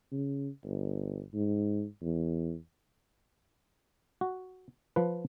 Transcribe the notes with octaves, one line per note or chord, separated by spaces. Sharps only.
C#3
G1
G#2
E2
F#4
F3 B4